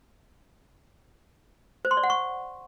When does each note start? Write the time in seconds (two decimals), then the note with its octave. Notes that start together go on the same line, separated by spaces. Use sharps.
1.85 C5
1.91 C6
1.97 D5
2.03 F#5
2.10 C#6